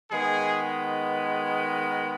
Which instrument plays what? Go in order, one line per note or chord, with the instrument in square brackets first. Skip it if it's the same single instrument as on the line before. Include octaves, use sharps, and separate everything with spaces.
[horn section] D#3 G#3 B3 G#4